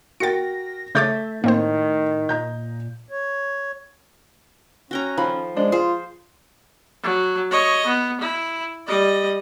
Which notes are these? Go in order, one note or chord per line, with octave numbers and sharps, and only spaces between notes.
F#4 A#4 G5 A6 A#6 C#7
C#3 A3 C#5 E5 D6 G6 A6
A2 D#3 A#3 C4 C5
A#2 D#5 A#5 G6
C#5
C#4 F#4 G5 A#5
D#3 F3 A4 B5
G#3 D4 C5 D#5
F4 G#4 C5
F#3
C#5 D#5
B3
E4
G3 D#5